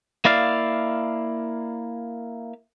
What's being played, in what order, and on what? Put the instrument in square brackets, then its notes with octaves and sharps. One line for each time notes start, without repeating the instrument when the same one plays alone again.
[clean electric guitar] A#3 E4 D5 F5